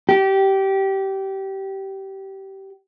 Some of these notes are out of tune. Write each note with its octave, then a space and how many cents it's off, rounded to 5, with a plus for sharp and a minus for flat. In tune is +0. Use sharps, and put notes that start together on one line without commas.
G4 -20